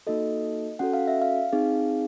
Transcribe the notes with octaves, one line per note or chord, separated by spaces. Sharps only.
A#3 D#4 F#4 A4 D#5
C#4 F#4 A4 F#5
F5
E5
F5
C4 D#4 G#4